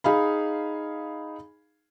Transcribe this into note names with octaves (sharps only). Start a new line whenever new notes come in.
D#4 G#4 F5 B5